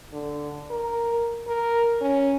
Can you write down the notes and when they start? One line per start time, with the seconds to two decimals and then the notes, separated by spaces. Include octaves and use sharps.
0.13 D3
0.70 A#4
1.47 A#4
2.01 C#4